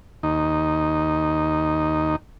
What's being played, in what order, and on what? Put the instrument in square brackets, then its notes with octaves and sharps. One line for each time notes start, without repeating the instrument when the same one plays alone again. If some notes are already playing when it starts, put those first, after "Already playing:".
[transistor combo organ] D#2 D#4